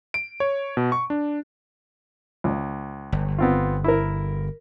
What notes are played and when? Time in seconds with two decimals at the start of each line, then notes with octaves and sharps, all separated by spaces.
0.14 D7
0.40 C#5
0.77 B2
0.92 C#6
1.10 D4
2.44 C#2
3.12 G1
3.38 B3 C4 F4
3.84 E4 A#4